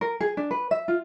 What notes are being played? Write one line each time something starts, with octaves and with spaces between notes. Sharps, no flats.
A#4
G#4
D4
B4
E5
F4